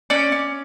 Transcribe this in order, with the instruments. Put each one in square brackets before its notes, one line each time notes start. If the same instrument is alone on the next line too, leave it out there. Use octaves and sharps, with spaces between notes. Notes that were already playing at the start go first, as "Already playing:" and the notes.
[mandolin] C#4 D5
C#4